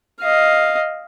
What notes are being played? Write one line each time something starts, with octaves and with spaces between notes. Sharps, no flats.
D#5 F5